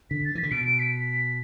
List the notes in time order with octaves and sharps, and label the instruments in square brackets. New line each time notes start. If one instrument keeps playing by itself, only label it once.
[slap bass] D3 [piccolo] B6
[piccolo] A6
[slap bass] E3
[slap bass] D3 [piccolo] B6
[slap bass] B2 [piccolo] D7
[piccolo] D7
B6